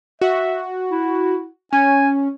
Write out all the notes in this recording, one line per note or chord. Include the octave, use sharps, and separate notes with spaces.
F#4 E5
E4
C#4 G#5